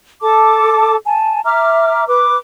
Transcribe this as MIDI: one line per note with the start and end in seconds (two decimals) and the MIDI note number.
0.21 0.96 69
0.21 0.96 81
0.21 0.96 86
1.05 1.40 80
1.05 1.40 81
1.44 2.04 76
1.44 2.04 82
1.44 2.04 86
1.44 2.04 89
2.07 2.37 71
2.07 2.37 86